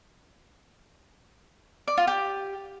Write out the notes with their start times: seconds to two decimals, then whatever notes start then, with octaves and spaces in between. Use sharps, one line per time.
1.88 D5
1.97 F4
2.07 G4